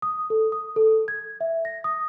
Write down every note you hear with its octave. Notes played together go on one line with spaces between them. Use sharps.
D#6
A4
D#6
A4
G#6
E5
A#6
D#6